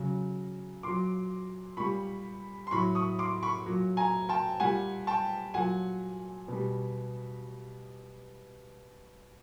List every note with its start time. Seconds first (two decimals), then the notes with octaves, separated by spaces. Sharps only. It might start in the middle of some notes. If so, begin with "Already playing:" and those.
Already playing: C#3 F#3
0.83 A#2 F#3 C6 D6
1.77 A#2 G3 B5 C#6
2.67 C6
2.71 A2 F#3 B5 C#6
2.95 C#6 D#6
3.19 C6 D6
3.43 B5 C#6
3.66 A#2 F#3
3.97 G#5 A#5
4.29 G5 A5
4.60 A#2 G3 F#5 G#5
5.07 G5 A5
5.54 A#2 F#3 F#5 G#5
6.48 B2 G3